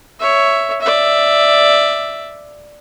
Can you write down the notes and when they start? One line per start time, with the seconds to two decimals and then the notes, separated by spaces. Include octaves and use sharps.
0.20 C#5 E5
0.81 D5 E5